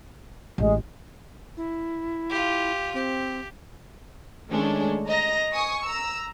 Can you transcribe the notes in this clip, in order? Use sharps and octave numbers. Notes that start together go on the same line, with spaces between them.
A1 G#3
E4
F4 G4
C4 G4
D#3 G#3 A3 C#4 D4
D#5 A#5 A#6
G#5 C#6 D#6
A#5 E6